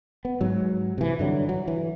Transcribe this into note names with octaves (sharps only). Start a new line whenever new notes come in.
B3
G#2 F#3
C3 E3
G2 D3 F#3
F#3
E3